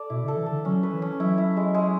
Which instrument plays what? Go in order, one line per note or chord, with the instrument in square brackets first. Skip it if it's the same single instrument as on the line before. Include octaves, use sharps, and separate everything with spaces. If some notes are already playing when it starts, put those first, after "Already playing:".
Already playing: [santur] A4 D5
[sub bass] B2 [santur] E4
[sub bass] C#3 [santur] A4
[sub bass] E3
[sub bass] D3 [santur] A4
[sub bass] F#3 [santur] C#4
[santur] B4
[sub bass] E3
[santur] C#4
[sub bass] F#3 [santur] E4
[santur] E4
G#3
G#3